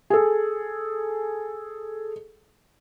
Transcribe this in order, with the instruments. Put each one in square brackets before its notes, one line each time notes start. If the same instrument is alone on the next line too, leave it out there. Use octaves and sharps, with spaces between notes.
[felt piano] G#4 A4